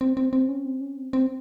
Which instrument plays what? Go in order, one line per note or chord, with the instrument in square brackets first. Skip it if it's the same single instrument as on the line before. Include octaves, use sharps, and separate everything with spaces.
[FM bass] C4
C4
C4
C#4
C4
C#4
C4
C4